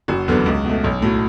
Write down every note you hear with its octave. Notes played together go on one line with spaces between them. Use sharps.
F#1 F#4
E2 D3 F#3 B3
C#2
B2 A3
B1
A2 F#3